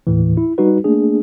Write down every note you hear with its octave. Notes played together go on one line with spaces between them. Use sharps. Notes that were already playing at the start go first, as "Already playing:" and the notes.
D#2 A2 E3
E4
G3 D#4 F#4 B4
A3 A#3 D4 G#4